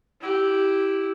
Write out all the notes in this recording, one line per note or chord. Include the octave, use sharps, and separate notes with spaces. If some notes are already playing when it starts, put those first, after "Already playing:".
E4 G4